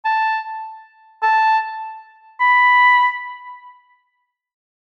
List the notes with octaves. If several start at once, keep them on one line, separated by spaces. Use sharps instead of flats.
A5
A5
B5